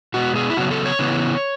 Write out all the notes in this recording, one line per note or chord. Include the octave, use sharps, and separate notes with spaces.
B2 G#3 B3 F#4
G#4
E4
C#3 F#3 B3 F#4
A4
C#5
C#3 E3 B3